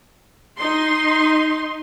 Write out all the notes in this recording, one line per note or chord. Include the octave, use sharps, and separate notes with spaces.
D#4 C6